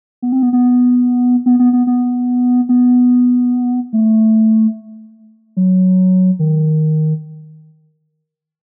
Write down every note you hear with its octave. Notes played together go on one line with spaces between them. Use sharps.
B3
C4
B3
B3
B3
B3
B3
B3
B3
A3
F#3
D#3